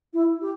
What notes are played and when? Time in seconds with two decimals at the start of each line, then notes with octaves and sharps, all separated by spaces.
0.13 E4
0.41 G4